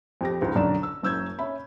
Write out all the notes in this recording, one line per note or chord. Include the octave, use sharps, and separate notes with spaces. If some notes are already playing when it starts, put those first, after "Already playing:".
F2 G4 A#6
C#2 G#2
B1 F#2 D3 D5 A#5 E7
E6
F#1 F#2 E6 G6 G#6
C#4 E5 B5